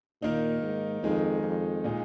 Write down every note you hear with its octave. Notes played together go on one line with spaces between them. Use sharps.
A#2 D#3 A#3 D#4
G#2
F2 D#3 G#3 D#4
F2
A#2 G#3 D#4